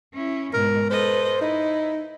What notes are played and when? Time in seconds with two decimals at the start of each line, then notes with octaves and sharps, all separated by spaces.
0.15 C#4 E4
0.53 G#2 B2 A#4
0.90 A4 B4 C5 D#5
1.41 D#4 E4